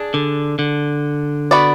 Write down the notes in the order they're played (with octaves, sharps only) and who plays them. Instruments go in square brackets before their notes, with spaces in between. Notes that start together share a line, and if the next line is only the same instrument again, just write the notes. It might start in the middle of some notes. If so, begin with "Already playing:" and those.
Already playing: [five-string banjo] D4 G#4
[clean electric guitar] D3
D3
[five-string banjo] B3 F#4 B4 D5